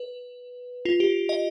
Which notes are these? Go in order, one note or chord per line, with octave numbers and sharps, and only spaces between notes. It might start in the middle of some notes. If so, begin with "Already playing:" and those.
Already playing: B4
F4
G4
D#5